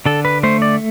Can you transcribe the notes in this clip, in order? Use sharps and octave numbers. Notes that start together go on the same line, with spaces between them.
D3 A4
B4
A3 C5
D5